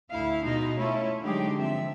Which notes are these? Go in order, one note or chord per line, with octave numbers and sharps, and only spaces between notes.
D2 A2 E4 F5
B2 G#3 D#4 F4
A3 C#4 E4 F4 A4 C#5
D3 F#3 G#3 D#4 G4 G#4
F3 C4 E5